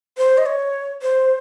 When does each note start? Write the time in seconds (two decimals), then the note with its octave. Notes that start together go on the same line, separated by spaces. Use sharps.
0.18 C5
0.38 D#5
0.46 C#5
1.02 C5